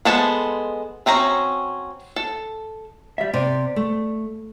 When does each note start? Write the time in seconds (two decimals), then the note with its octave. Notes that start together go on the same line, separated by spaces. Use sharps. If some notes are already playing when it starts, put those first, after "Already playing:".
0.05 G#3 B3 A4 C5 A5
1.06 F#3 C4 C#4 A#5
2.16 A4
3.18 G3 E5
3.34 C3 D5
3.76 A3